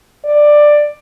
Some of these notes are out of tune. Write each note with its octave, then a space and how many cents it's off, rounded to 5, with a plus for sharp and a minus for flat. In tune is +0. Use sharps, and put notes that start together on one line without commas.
D5 +10